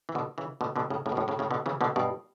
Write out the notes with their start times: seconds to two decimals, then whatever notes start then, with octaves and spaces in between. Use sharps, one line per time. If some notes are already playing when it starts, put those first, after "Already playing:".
0.09 E3
0.15 B2 D3
0.38 C#3 E3
0.61 B2 D3
0.76 B2 D3
0.90 A2 C#3
1.06 A2 C#3
1.12 B2
1.17 F#2 A2
1.28 A2 C#3
1.39 A2 C#3
1.51 B2 D3
1.66 C#3 E3
1.81 B2 D3
1.96 G2 B2